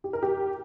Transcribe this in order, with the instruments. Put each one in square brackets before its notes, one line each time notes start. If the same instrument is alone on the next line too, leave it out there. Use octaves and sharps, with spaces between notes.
[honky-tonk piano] G4
A#4
G4